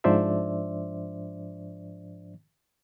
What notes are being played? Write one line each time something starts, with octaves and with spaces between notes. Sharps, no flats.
G#2 F3 D4 C5 D5 E5